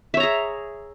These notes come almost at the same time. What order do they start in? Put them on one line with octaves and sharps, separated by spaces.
E5 C#5 A#5 G#4